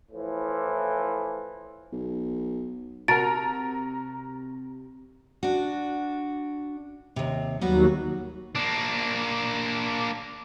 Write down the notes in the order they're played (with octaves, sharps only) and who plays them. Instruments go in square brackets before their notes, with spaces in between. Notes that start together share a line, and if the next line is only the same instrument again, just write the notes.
[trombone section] A2 E3 F3
[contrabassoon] B1
[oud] C3 [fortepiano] F#4 A#4 [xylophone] A5 A6 D7 [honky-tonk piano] A#5
[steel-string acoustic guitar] D4 F#4
D#2 C3
[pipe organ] D#2 F#3 [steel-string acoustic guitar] G3 B3 F#4
[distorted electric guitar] A#3 D4